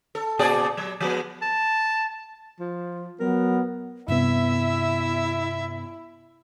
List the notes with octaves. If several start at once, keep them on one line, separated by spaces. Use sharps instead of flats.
A4
A#2 G#4 D5
F#3
F3 G#3 B3
A5
F3
F#3 B3 A#4
G2 C3 B3 E4 E5